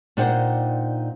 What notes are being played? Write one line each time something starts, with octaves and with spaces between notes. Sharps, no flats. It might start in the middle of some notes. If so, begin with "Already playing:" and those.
A#2 D4 D#4 C5 F#5 G5